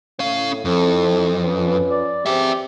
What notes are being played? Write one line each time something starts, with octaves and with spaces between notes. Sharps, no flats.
A2 C#4 F5
F2 C4 E4 A4
C#4 F4 B4
D5
C4 G4 G#4 E5